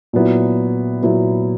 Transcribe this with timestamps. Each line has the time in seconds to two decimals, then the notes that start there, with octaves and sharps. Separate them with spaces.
0.13 A#2 F#3 B3 E4
1.03 A#2 F#3 B3 E4